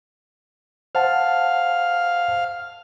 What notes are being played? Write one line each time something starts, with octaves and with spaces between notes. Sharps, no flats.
C5 F5 F#5 A5